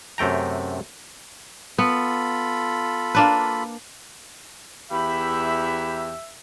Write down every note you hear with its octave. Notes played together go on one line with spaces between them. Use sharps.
F#2 C3 A3 G5 A#5
B3 F4 A4 B5
A#3 D4 B4
E2 G4 E5 B5